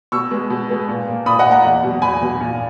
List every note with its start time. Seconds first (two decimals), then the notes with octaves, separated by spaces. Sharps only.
0.12 B2 C#6 E6
0.31 G#3 B3
0.50 B2
0.69 G#3 B3
0.88 A#2
1.07 A#3
1.26 A#2 B5 D#6
1.39 D#5 F#5
1.46 A#3
1.51 F#5 A#5
1.64 E2
1.83 B2 F#3
2.02 E2 G#5 B5
2.22 B2 F#3
2.41 A#2